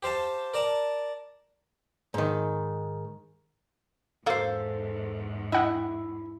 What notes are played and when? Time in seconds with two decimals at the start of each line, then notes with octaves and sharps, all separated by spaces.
0.03 G4 C5 F5 A5
0.54 A#4 D5 A5 A#5
2.14 G#2 D#3
4.26 E2 G#2 A#3 F#4 A4 C5 F5
5.52 E4 D#5 F#5 G5